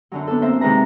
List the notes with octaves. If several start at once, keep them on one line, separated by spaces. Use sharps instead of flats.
F#2 D3 F#3
B3 D4 A4
A#3 C4 C5 E5
C3 D#3 G#3 B4 A#5